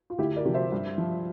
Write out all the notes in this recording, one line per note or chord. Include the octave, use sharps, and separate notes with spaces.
F4
D2 E4 G4
A#4 D5
C3 F3
C5 E5
G2
F3